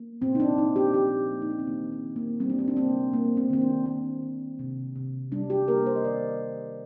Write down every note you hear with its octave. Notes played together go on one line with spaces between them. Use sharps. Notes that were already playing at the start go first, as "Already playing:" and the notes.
Already playing: A#3
A#2 C4
D#4
D4
A#2 D#4
G4
F3 G4
A#3
D#4
D4
C4
D#3 A#3
C4
D#3
A#3
G3 C4
D4
C4
D4
A#3 C4
A#3
C4
D#3 C4
D4
A#3 C4
D#3
C3
C3
G3 D4
G4
A#3 A#4
C5
D#5
D#3 D5
D#3